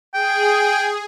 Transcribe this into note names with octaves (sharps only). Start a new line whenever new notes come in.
G#4 G5